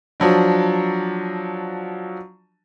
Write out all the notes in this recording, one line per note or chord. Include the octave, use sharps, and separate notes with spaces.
F3 F#3 D4